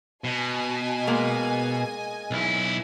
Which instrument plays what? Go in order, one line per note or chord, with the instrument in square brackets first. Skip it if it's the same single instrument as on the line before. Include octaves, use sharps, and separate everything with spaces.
[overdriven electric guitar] B2 [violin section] D#5 G#5
[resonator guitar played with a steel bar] G#3 A#3
[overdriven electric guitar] B1 E4